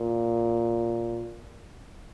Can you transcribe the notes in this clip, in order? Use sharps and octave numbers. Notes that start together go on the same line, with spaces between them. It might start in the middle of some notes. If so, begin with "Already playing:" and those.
Already playing: A#2